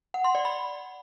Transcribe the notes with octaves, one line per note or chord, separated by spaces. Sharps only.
F#5
C6
D5
B5